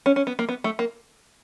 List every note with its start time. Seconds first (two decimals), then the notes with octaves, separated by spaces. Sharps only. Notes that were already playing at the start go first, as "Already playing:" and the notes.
0.06 C#4
0.16 C#4
0.27 B3
0.39 A#3
0.49 B3
0.64 A3
0.79 A#3